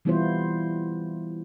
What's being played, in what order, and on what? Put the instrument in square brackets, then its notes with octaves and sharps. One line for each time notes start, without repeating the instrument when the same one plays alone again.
[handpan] E3 G3 B3 E4 F4 C5